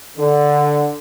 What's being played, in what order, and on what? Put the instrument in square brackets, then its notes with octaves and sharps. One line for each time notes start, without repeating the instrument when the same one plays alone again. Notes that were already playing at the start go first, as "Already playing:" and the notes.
[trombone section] D3